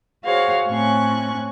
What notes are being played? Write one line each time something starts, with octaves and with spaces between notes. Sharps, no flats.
F#4 G#4 C5 C#5 F5 F#5
A2 C4 C#4 G#5 C#6 F#6